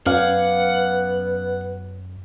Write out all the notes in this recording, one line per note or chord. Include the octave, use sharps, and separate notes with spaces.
F#2 B3 D5 F5 F#5 G#5